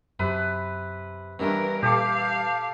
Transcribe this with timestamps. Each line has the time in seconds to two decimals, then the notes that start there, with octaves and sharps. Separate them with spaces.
0.20 F#2 C3 B4
1.39 G2 D#3 E3 B3 C#4 D4 A#4
1.83 A#2 G4 A4 F5 D6